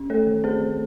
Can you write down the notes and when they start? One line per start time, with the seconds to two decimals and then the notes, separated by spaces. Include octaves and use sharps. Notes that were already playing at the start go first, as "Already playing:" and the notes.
Already playing: C#4
0.10 A3 A4 C#5
0.27 D#3
0.44 C4 G#4 C5
0.60 D#3